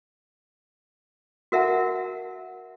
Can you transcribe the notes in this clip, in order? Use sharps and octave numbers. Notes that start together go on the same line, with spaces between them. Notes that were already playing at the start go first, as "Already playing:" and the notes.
F#4 A#4 E5 F#5 A5